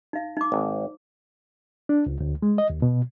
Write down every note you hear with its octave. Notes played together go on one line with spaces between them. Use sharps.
D#4 F5
D#4 D6
G#1
D4
C#2
D2
G#3
D#5
D#2
B2